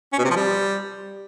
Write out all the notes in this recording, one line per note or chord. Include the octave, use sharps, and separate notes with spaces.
C#4
B2
C3
F3
G3